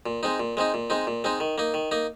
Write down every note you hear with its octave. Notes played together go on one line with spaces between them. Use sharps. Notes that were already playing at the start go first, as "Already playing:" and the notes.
A#2
G#3 C4 D#4
A#2
G#3 C4 D#4
A#2
G#3 C4 D#4
A#2
G#3 C4 D#4
D#3
A#3 D#4
D#3
A#3 D#4